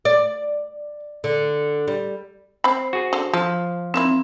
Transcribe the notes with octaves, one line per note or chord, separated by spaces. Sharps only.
D5
D3
G3
C4 C5 B5
F#4 G#4
D3
F3 A4
D#3 A#3 C4 E4